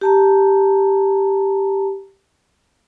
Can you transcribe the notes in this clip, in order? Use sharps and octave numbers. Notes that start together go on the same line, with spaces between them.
G4 A5 A#5